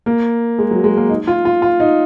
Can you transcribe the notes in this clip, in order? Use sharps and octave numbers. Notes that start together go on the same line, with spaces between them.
A#3
G#3
F#3
G#3
A#3
D#4
F4
F4
F4
D#4